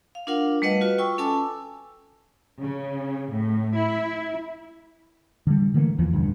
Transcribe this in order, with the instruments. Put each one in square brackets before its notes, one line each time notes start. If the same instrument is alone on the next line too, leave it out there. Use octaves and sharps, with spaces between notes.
[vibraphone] F5
D4 F4 A#4 F5 F#5
G3 A3 B4 D#5 F#5
F4 F#4 B4
F4 G5 C#6 E6
C#4 A4 G#5 A5 D6 E6
[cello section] C#3
A2
E4
[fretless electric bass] D3 G3
D3 E3 A3 A#3
F1 D#2 E3 F3
D#1 G2 D3